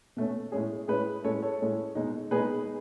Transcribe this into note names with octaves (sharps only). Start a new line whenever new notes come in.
B2 A3 C#4
A2 G#3 C#4 G#4
A2 G#3 C#4 G#4 B4
A2 G#3 C#4 A4 C#5
A4 C#5
A2 G#3 C#4
B2 G#3 D#4
B2 G#3 D#4 G#4 B4